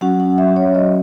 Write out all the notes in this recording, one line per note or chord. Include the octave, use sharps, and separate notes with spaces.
F#3 C#4 F#4 F#5
F#5
E5
C#5
D#5